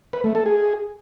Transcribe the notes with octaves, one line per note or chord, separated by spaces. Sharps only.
B4
A3
A4
G#4